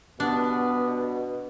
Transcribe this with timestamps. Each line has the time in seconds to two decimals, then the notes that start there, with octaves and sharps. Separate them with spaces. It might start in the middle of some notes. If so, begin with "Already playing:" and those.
0.20 G2 B2 B3 D4